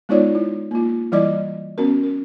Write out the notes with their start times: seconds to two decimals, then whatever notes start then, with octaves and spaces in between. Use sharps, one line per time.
0.09 G#3 B3 D#4 F4 C#5 D5
0.35 E4
0.71 A#3 F4
1.12 E3 G3 E4 D5 D#5 D6
1.78 B3 C#4 F#4 A#4
2.03 A#4